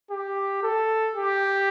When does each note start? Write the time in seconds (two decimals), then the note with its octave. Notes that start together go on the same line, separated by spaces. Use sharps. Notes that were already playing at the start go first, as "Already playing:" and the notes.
0.11 G4
0.63 A4
1.16 G4